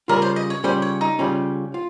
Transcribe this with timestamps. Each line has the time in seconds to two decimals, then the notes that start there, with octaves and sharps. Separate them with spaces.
0.08 C#3 G3 C#4 F4 A#4
0.22 C5
0.36 D#5
0.50 C#5
0.63 C#3 G3 C#4 F4 C5
0.82 C#5
1.01 D#4
1.19 C#3 G3 C#4 F4
1.74 F4